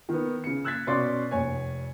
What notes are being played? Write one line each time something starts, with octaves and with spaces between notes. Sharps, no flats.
D#3 B3
C#3 C#7
E6 F#6 G#6 A6 B6
B2 C#4 D5 C6 A6 C7
F1 C#5 G#5